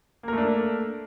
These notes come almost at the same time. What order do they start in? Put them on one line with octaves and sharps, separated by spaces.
A#3 A#4 A3 D4